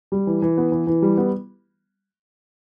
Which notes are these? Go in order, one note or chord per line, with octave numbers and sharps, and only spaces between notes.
G3
E3
E3
B3
E3
E3
G3
B3